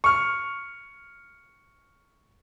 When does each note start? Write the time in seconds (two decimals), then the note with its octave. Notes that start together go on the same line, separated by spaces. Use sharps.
0.04 C#6 F6